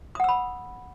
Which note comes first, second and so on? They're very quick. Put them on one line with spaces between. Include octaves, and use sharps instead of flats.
D#6 F#5 E6 B5